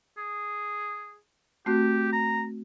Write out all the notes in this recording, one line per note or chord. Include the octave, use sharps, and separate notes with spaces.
G#4
A3 C4 F#4 G4
A#5